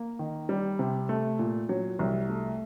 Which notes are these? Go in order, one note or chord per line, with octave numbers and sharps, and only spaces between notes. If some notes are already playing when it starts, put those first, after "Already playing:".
Already playing: A#3
D#3
G3
C3
A3
A#2
F#3
C2
A3